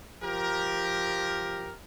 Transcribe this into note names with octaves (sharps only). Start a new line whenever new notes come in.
F3 G4 A#4